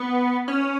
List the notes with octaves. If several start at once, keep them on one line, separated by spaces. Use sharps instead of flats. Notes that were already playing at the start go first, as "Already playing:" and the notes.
Already playing: B3
C#4